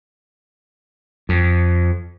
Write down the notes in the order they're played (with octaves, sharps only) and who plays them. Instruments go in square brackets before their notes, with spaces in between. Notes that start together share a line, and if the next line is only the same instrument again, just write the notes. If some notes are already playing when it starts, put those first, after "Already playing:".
[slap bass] F2